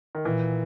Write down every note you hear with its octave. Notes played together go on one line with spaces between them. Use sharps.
D#3
A#2 E3